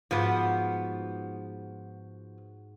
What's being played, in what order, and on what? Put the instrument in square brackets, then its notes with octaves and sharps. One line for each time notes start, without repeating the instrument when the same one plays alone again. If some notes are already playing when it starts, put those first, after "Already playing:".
[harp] G#2 F#4 [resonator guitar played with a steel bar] F3 B3